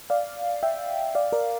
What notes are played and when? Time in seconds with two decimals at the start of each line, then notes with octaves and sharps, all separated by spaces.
0.10 D5 F5
0.63 E5 G5
1.15 D5 F5
1.32 A#4 D5